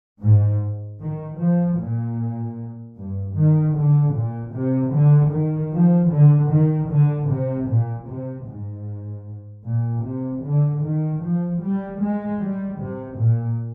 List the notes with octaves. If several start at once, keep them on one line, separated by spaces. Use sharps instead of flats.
G#2
D#3
F3
A#2
G2
D#3
D3
A#2
C3
D3
D#3
F3
D3
D#3
D3
C3
A#2
C3
G#2
A#2
C3
D3
D#3
F3
G3
G#3
G3
C3
A#2